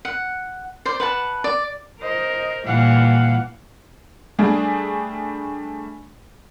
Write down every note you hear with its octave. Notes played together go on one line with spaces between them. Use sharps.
F#5
C5 D5
B4 F#5 A5
D5
A#4 C5 D#5
A#2 E3 G3 F5 F#5
G3 A3 D4 G#4